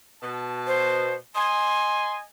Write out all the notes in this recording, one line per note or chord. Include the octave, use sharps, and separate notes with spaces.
B2 A5
C5
D#5 G#5 C6